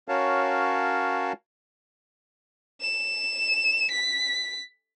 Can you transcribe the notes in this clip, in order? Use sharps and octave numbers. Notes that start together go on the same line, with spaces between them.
C#4 F#4 A#4 C#5 F5 A5
E7
B6